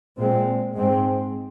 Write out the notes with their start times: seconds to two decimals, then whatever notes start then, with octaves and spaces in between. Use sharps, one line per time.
0.18 A#2 G#3 C4
0.74 G#2 G#3 C4